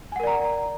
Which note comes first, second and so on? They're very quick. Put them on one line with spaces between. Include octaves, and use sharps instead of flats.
G#5 F#5 A#4 D5 A#5